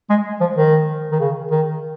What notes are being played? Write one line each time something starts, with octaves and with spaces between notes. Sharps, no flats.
G#3
F3
D#3
D#3
C#3
D#3